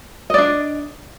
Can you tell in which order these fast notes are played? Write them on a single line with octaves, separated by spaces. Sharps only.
D#5 D5 D4